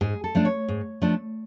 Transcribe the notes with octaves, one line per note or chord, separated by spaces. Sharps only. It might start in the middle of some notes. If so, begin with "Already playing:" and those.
G#2 G#4
A4
F3 A3 D4
C#5
G#2
F3 A3 D4